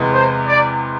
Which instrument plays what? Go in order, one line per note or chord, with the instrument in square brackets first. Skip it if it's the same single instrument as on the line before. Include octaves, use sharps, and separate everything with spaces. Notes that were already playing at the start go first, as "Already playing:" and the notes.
Already playing: [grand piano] E2 C3 G#3 B3
[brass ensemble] C5
D5